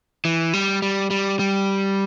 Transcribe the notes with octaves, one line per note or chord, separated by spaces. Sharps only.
E3
G3
G3
G3
G3